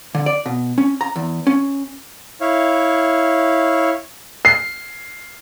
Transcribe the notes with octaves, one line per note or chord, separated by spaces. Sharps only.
D3
D5
B2
C#4
A#5
E2
C#4
E4 C#5 F5
C7